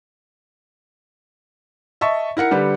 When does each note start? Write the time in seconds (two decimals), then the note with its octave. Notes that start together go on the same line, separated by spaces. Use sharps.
2.01 D#5 E5 A5 C#6
2.37 E4 A#4 F#5 C#7
2.51 D3 G3 G4 B4